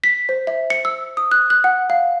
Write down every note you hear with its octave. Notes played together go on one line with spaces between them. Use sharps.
B6
C5
E5
C#7
E6
D#6
F#6
F#6
F#5
F5